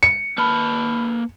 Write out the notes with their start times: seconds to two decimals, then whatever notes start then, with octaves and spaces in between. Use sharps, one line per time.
0.03 C#7
0.38 A#3 B4 A5 B5 F6